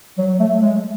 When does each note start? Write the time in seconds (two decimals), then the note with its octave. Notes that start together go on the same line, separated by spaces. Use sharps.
0.18 F#3
0.40 A3
0.62 G#3